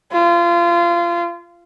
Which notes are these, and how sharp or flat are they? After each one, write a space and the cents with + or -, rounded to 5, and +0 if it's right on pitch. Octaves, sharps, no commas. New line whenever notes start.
F4 -25